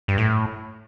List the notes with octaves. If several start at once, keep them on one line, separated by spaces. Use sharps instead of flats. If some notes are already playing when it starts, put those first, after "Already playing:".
G2
A2